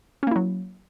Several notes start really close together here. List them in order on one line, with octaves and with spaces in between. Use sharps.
C#4 A#3 E4 F#3